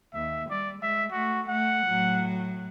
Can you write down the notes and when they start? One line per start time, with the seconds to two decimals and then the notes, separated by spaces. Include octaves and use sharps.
0.14 D#2 E5
0.50 G3 D5
0.83 G#3 E5
1.12 A3 F#4
1.49 A3 F#5
1.86 A2 F#3